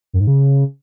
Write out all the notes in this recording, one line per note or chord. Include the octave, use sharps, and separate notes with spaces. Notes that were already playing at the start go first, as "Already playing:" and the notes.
F#2
G#2
C#3